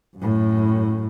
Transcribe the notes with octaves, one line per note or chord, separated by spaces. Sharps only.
F#2 A2